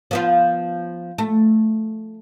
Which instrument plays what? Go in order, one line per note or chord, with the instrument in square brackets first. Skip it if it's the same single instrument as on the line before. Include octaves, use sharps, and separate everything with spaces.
[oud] F3 B3 F4
A3